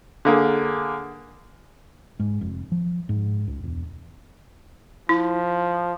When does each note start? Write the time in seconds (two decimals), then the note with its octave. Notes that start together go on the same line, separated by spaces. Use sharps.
0.25 D3 A#3 G#4
2.20 G#2
2.41 F1
2.72 F3
3.09 G#2
3.48 C#2
3.64 E1
5.09 F3 E4